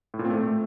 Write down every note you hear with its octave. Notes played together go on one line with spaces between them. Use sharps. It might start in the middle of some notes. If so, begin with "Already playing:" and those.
A2
A#2
C4
A3